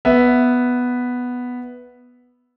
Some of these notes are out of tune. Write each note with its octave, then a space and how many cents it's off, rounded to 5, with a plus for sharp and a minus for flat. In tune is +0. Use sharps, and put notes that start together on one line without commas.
B3 +0 E5 +0